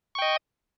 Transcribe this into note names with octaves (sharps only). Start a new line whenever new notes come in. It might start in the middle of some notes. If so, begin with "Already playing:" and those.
D#5 G5 C#6